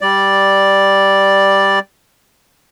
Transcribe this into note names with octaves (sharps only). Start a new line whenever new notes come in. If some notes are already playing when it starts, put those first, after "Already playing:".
G3 D5